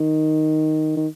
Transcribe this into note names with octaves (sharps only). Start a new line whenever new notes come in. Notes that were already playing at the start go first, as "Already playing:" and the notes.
Already playing: D#3
D#3